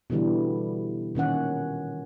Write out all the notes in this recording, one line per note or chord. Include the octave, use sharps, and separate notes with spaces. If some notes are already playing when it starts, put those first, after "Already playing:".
B2 D3 E3 G3
A#2 D#3 C#4 F#5